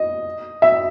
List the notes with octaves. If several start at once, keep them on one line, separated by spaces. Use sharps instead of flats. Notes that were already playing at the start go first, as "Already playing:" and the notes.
Already playing: D#5
E5